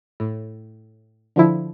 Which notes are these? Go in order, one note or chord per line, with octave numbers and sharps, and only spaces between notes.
A2
D3 F3 E4